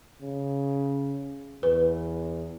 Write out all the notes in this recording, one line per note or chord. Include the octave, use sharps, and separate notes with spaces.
C#3
E2 B4